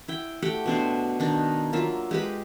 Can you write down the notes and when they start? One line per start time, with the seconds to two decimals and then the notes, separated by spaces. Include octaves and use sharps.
0.08 E4 G5
0.42 A3 G4 F#5 G5
0.66 B2 D4 C5
1.20 D#3 D4
1.73 F#3 A#3 F4 E5
2.11 G#3 G4 B4